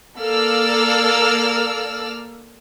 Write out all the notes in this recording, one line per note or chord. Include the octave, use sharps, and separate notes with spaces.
A#3 A4 D5 E6 F6